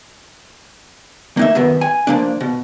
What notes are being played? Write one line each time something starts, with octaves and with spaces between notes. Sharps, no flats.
A#3 D#4 E5
F#2 D#3 B3
G#5
F3 A#3 D4
B2